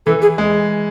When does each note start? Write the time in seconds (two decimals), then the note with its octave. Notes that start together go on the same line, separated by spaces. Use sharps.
0.06 E3 A4
0.22 G#4
0.38 G#3